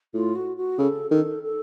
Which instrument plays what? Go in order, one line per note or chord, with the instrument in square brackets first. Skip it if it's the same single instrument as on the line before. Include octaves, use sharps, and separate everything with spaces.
[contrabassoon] A2 [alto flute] F4
[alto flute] F#4
F#4
[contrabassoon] C#3 [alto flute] A4
[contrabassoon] D#3 [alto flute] A4
[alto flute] A4